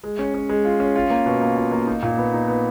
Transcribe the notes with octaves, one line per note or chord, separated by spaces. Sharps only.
G#3
C#4
C#4
G#3
F4
C#4
F4
A#3
B2
A#3
F4
A#3
D#4
A#2
B3
D#4
B3